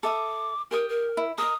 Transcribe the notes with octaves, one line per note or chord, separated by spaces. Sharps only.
A4 E5 D6 D#6
G4 A#4 G5 D#6
A#4
E4
A#4 D#5 D#6